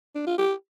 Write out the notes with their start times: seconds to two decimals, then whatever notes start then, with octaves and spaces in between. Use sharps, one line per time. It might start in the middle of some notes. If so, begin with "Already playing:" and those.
0.15 D4
0.27 F4
0.38 G4